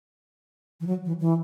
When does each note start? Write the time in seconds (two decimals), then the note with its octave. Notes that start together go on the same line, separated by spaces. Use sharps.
0.81 E3
0.87 F#3
1.05 E3
1.20 E3